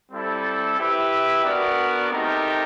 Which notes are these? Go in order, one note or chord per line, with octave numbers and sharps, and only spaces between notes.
G3 C4 E4 A4
E4 G4 B4 E5
B3 D4 F#4 A#4 D5
A3 C4 D#4 G4 A#4